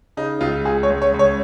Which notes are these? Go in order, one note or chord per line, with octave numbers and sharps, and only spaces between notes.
C#3 D#4
C#2 F4
C#2 G#4
C#5
C#2
C#5
C#2
C#5